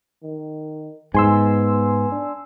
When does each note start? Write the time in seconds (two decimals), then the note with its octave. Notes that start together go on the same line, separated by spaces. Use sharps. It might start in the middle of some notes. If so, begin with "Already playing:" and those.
0.23 D#3
1.14 G#2 B3 G#5 C6 E6
2.12 D4